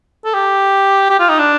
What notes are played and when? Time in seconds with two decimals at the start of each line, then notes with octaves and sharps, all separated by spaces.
0.25 A4
0.34 G4
1.10 G4
1.19 F4
1.29 D#4
1.39 D4